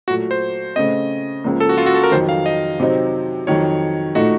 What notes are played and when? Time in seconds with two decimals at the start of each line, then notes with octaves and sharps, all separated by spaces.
0.08 A#2 F#3 A3 F#4
0.31 C5
0.76 C#3 A3 C4 D#5
1.44 C#2 C#3 F3 A#3
1.60 A4
1.69 F#4
1.78 F4
1.86 F#4
1.94 A4
2.04 A#4
2.12 F2 D#3 F#3 C5
2.29 F5
2.46 D#5
2.80 C3 F#3 C4 D#4
3.47 F2 D#3 F#3 C#5
4.15 A#2 A3 D#4 F#4